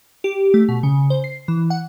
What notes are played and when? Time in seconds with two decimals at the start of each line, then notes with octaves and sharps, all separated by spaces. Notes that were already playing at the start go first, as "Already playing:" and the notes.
0.24 G4
0.54 A3
0.68 B2
0.83 C#3
1.10 C5
1.24 C7
1.48 E3
1.70 F#5